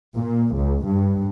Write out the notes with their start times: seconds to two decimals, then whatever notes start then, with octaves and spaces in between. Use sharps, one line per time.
0.17 A#2
0.55 C#2
0.86 G2